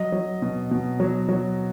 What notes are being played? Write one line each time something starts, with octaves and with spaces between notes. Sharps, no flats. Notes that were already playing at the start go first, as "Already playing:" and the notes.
Already playing: F#3 D#5
F#3
B2
B2
F#3
F#3